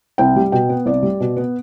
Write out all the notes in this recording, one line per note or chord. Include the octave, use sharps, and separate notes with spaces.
C2 G5
G3
B2 G5
B3
C2 D5
G3
B2
B3